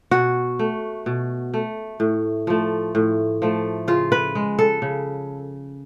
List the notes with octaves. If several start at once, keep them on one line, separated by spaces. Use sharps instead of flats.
B2 F#4
A3
B2
A3
A2
F3 A3
A2
F3 A3
C#3 F4
B4
G#3
A4
C#3